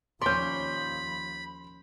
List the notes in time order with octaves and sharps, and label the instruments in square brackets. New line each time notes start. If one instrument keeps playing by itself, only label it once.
[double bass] D#2 F3 [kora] C#4 D5 [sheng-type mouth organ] B5 [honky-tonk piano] C6 G6